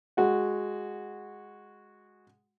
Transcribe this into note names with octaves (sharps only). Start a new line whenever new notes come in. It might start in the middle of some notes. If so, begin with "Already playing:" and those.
G#3 F#4 F#5